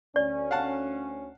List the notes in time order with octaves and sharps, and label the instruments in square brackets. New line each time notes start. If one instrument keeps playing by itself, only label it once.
[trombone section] D2 C#4 [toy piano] D5
[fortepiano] F5 F#5 A5